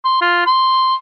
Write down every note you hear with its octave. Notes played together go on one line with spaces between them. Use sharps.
C6
F4
C6